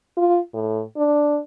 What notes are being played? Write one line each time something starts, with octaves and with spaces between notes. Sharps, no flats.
F4
A2
D4